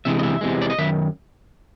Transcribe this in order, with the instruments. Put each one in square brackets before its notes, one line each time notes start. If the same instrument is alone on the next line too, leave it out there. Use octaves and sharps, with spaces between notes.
[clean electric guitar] E2 C3 E3 G#3 E5
D#5
E5
E2 C3 E3 G#3
D5
D#5
F#2 D#3 E5